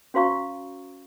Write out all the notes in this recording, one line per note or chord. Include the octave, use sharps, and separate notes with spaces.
C#4 F#4 C5 F5 A#5 C#6